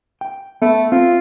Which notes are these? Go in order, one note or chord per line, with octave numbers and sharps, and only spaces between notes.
G5
A3 B3
C4 F4